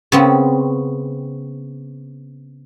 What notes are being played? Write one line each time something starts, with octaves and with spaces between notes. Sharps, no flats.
C#3 B3 C4